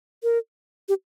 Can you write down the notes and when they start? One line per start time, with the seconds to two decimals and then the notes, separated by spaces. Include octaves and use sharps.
0.23 A#4
0.89 G4